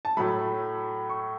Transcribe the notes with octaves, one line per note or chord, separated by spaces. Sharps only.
A5
A2 F#3 A3 B5
C#6